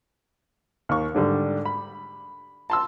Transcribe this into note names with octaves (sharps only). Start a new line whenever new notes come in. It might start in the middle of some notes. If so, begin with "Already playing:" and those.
D#2 C#6
G#2 D3 G3
B5
A5 C6 E6